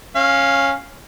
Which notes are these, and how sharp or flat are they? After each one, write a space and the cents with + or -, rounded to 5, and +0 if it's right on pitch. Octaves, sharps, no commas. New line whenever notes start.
C#4 -15 F5 +0